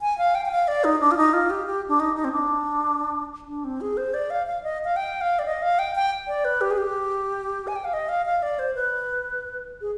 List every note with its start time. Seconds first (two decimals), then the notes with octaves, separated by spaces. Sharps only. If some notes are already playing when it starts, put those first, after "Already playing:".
0.01 G#5
0.18 F5
0.35 G5
0.45 G5
0.51 F5
0.68 D5
0.84 D#4
1.01 D4
1.11 F4
1.17 D#4
1.33 F4
1.50 G4
1.66 G4
1.88 D4
2.00 D#4
2.16 D#4
2.24 C4
2.32 D4
3.47 D4
3.64 C4
3.81 G#4
3.97 C5
4.14 D5
4.30 F5
4.47 F5
4.63 D#5
4.84 F5
4.96 G5
5.21 F5
5.39 D5
5.45 D#5
5.62 F5
5.79 G5
5.95 G5
6.28 D5
6.44 B4
6.61 G4
6.71 G#4
6.77 G4
7.67 G#5
7.76 G5
7.84 F5
7.93 D#5
8.09 F5
8.26 F5
8.42 D5
8.59 C5
8.75 B4
9.81 G#4